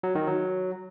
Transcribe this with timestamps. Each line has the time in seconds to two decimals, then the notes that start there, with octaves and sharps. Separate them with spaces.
0.03 F#3
0.15 D#3
0.27 F#3